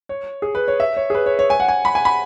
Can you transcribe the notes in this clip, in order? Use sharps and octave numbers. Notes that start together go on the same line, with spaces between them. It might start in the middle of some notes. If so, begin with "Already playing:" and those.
C#5
G#4
B4
C#5
E5
C#5
G#4
B4
C#5
C#5
G#5
F#5
G#5
B5
G#5
B5